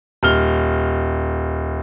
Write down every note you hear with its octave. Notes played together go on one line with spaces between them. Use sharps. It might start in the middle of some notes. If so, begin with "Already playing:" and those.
D#1 F6 G7